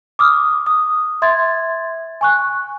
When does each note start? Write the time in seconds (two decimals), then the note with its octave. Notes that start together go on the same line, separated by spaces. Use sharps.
0.19 D6 D#6 F6
0.66 D#6
1.22 E5 C6 G#6 A6
2.21 G#5 C#6 F#6